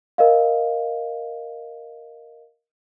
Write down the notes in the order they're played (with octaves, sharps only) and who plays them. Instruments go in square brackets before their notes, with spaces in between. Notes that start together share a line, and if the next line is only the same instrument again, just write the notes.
[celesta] A#4 D#5 F5